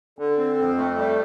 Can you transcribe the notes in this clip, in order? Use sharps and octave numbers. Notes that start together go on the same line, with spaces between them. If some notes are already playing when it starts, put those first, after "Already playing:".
D3
C4
F2
A3
G3